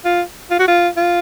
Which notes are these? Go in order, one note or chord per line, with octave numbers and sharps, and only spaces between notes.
F4
F4
F#4
F4
F4